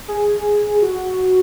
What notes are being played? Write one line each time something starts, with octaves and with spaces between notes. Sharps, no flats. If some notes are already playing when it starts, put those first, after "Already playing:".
G#4
F#4